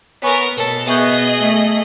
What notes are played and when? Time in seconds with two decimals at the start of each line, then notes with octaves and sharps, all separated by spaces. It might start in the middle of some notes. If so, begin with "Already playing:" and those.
0.22 B3 A#4 C#5 G#5 C#6
0.57 B2 A4 A#4 C#5 A5
0.87 B3 G#4 D#5 E5 C#6 G6
1.40 A3 A4